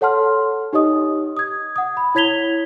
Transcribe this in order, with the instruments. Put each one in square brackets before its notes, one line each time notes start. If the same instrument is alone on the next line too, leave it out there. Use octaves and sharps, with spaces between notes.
[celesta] A4 C#5 F#5 A5 C6 F6
D#4 G4 C#5 D#5 D#6
D#6 G#6
F#5 D#6
B5
E4 C#5 G#6 B6 F7 G7